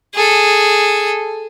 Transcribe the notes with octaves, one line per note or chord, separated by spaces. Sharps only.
G#4 A4